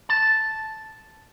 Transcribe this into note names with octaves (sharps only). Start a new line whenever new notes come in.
A5